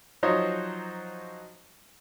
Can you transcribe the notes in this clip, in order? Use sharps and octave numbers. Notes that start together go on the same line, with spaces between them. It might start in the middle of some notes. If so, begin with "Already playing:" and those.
F3 F#3 D#4 C5 C#5 D#5